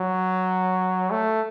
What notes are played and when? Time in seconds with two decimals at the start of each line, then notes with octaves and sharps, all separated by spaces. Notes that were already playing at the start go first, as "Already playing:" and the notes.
Already playing: F#3
1.11 A3